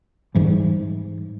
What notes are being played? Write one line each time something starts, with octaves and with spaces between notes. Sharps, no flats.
G#2 E3 G3